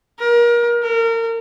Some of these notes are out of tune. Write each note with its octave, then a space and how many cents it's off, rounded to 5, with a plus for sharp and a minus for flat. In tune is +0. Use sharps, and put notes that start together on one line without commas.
A#4 +30
A#4 -30